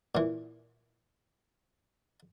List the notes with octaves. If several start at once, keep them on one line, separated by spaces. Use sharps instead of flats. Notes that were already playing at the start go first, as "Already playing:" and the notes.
A#2 E3